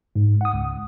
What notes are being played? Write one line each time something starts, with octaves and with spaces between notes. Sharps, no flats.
G#2
F#5 D#6
C#2